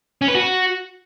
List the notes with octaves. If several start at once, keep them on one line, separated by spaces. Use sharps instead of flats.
C#4
B4
F#4